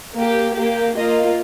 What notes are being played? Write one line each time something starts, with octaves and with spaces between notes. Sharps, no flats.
A#3 G4
A#3 G4
A#3 F4 D#5